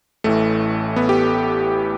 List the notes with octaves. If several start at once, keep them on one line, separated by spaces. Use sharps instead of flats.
A1 A2 E3 A3
B3
G4